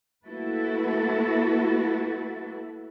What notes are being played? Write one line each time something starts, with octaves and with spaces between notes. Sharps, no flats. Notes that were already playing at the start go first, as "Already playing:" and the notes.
A3 A#3 E4 F#4 A4 B4